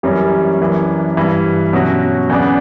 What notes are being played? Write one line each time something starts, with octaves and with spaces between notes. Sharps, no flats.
F#2 E3 G3 A#3 C#4
F#2 E3 A#3 D4
G2 E3 G3
B2 F#3 C#4 F#4
E2 C#3 F#3 B3 D4